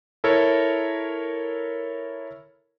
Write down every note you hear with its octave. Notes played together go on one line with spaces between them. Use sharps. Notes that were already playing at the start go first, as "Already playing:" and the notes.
E4 A4 A#4 C#5